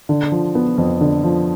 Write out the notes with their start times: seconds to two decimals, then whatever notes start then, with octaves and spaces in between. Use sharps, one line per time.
0.09 D3
0.32 F3
0.55 B3
0.78 F2
1.01 D3
1.24 F3